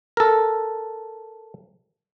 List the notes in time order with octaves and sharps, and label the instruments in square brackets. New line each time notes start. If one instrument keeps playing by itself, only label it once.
[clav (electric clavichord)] A4 A#4